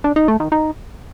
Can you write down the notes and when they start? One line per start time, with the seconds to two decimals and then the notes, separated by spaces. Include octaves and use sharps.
0.04 D4
0.16 D#4
0.28 A3
0.40 D#3
0.52 D#4